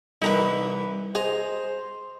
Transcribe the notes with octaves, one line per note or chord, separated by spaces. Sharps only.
C2 E3 D#4 E4 A#4 B4
G#4 C5 D#5 A#5